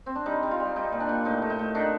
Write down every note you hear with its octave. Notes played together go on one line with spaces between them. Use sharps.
C4
D4
G3 D#4
G3
F4
G3
G3 D#4
A#2
D4
A#2
A2 D#4
A3
D#4
A3
D#3 D4